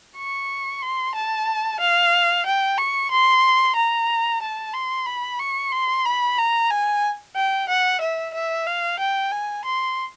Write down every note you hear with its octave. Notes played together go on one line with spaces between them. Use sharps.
C#6
C6
A5
F5
G5
C#6
C6
A#5
A5
C6
B5
C#6
C6
B5
A#5
G#5
G5
F#5
E5
E5
F5
G5
G#5
C6